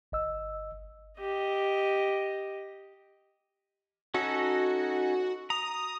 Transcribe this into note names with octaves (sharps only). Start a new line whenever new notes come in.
G1 D#5 E6
G4 D#5
C#4 D#4 F#4 A4
A#5 D#6